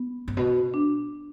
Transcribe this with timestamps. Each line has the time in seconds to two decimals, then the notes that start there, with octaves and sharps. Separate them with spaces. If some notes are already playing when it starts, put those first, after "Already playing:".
Already playing: B3
0.28 G#2
0.37 B2
0.74 D4